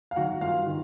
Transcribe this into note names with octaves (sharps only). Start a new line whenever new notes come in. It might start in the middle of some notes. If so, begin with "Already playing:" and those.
F5
D#3 F#3 F#4 F#5
G2 F4 F5
D#3